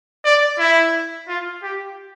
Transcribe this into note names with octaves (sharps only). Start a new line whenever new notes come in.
D5
E4
F4
G4